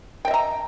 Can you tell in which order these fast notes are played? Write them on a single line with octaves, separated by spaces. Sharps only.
G5 D#5 E5 A#5